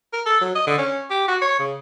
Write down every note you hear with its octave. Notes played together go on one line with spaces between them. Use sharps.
A#4
A4
F#3
D#5
D3
C#4
G4
F#4
C#5
C#3